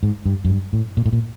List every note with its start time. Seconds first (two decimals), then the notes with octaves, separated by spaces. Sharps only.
0.03 G#2
0.26 G2
0.45 F#2
0.50 G2
0.73 A2
0.97 A#2
1.06 A2
1.13 A#2